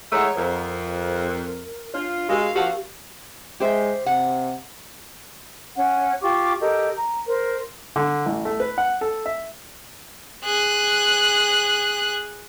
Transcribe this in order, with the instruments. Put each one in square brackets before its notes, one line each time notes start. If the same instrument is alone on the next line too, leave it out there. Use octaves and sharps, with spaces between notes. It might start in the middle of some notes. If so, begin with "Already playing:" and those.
[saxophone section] E3 G#3 A3 [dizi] C#5 [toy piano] F#5 A#5
[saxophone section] F2 [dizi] A#4
[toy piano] D4 C#5 [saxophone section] F4
[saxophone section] G#3 [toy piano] F#4 G4 A#4 [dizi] F5
[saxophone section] F3 A#3 F#4 [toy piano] G4 A#4 A5
[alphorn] G#3 [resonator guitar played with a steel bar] G4 C5 E5
[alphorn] C3 [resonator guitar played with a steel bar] F#5
[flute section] C#4 F#5
F4 G4 C#6 D6
G4 A4 A#4 D#5
A#5
A#4 C5
[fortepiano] D3
A1
A3
B4
F#5
A4
E5
[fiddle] G#4 F#6